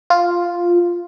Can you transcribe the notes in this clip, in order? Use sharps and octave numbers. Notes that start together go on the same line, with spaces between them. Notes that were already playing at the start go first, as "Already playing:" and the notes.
F4